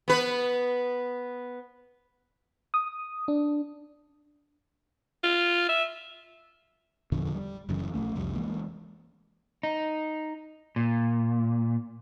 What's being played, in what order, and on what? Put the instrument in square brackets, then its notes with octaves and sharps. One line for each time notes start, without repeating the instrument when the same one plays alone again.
[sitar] B3 B4
[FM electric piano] D#6
D4
[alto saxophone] F4
E5
[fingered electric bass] E2 A#2 D3 F3
G3
F#1 F#2 C#3 E3
A#1 G2 A3 C#4
C2 F2 G3
E3 G#3 A#3
[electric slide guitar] D#4
A#2